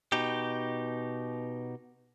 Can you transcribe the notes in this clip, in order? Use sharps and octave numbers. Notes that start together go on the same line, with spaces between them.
B2 D#4 G4